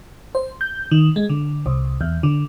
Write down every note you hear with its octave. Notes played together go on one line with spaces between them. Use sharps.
C5
G6
D#3
G#3
D3
C2
E2
D3